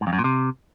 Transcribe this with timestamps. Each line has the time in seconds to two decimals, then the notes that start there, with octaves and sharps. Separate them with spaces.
0.01 G#2
0.07 F2
0.13 F#2
0.19 A#2
0.24 C3